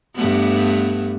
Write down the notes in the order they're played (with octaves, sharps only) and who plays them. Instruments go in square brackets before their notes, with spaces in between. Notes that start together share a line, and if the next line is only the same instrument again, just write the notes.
[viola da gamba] G2 A3 B3